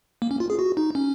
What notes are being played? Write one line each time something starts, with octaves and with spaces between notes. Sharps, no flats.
A#3
C#4
F4
G#4
F#4
D#4
C#4